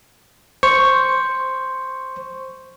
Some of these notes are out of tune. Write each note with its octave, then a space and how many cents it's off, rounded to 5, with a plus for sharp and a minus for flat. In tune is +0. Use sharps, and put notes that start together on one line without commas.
C5 +0 C#6 +0